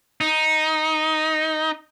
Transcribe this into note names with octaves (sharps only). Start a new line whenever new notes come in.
D#4